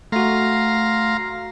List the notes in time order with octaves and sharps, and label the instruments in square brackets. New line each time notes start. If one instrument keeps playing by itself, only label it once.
[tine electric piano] A3 F#4 [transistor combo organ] F5 A#5 C6